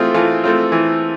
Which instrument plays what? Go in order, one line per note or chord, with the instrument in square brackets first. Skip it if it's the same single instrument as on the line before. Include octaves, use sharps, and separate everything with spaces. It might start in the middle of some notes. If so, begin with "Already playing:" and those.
Already playing: [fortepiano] E3 A3 C4 F4 G#4
E3 F4 A4
A3 C4 F4
E3